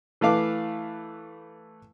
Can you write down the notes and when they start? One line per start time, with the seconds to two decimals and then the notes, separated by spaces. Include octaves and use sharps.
0.21 E3 A3 B4 F5 D6